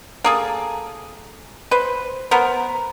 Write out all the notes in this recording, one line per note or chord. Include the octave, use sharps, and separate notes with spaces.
A#3 G#4 A4
B4 C5
B3 A#4 C5